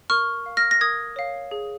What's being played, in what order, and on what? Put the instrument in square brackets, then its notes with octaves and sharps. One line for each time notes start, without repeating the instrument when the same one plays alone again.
[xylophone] A#4 C#6 F6
F5
F6 A#6
A#6
A#4 D#6 G#6
C#5 F5
G#4